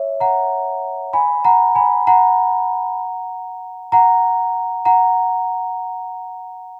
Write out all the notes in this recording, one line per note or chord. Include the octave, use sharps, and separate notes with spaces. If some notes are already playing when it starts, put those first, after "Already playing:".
Already playing: C#5 E5
F#5 A#5
G#5 B5
F#5 A#5
G#5 B5
F#5 A#5
F#5 A#5
F#5 A#5